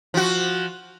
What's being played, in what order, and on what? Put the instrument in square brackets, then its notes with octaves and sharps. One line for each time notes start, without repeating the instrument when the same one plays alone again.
[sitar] F3 F#4